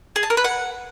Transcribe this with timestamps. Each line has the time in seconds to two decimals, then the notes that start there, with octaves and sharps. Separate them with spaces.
0.16 G#4
0.23 A5
0.30 A#4
0.37 B4
0.44 F#5